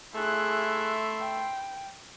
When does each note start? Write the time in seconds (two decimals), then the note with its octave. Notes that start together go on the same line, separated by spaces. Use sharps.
0.15 A3 E4 G#4 C6 F#6
1.19 G5